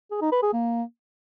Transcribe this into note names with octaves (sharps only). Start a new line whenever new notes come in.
G#4
D#4
B4
G#4
A#3